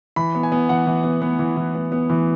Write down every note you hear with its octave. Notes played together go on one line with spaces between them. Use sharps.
E3 B5
B3
G#5
B3
E3 F#5
E3
B3
B3
E3
E3
B3
B3
E3